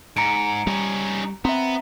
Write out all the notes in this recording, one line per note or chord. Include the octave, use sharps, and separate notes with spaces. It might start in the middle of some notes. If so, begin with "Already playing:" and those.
G#2 A#5 C#7 D7
G3 C#4 D#4
B3 C4 E5 A#5